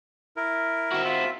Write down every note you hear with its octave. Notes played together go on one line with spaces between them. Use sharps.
E4 A#4
C4 F#4
F4 E5